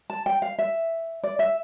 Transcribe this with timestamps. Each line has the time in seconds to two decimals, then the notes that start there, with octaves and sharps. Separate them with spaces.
0.10 A5
0.26 G5
0.42 F5
0.59 E5
1.24 D5
1.39 E5